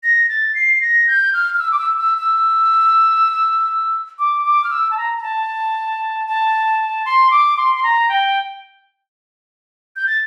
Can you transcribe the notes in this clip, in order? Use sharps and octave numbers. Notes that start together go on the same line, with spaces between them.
A#6
A6
C7
A#6
G6
F6
F6
E6
D6
E6
E6
E6
D6
D6
F6
E6
A5
A#5
A#5
A5
A5
C6
D6
C6
C6
A#5
G5
G6
A6